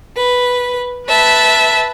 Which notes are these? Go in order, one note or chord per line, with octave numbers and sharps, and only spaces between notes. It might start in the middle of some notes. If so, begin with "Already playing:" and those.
B4
B4 E5 A5